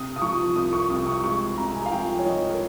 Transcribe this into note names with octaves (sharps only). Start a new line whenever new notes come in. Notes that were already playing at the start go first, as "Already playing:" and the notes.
Already playing: C3 D#6
D#6
F3 C#6
C2 D#6
C#6
C3 D#6
C#6
G#3 C#6
C3 A#5
G#5
F5
F3 G5
C#5
F3 D#5
A#4